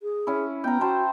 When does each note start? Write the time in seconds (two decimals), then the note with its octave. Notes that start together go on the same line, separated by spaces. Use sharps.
0.02 G#4
0.27 C#4 E4
0.64 B3 G5 A#5
0.81 F#4 C5 A5